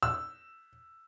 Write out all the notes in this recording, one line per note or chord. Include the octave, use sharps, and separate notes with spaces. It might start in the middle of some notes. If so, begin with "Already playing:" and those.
E6